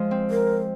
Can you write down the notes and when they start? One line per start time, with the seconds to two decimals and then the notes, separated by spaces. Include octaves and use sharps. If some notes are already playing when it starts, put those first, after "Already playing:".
Already playing: F3 G#3
0.11 C4
0.31 A#4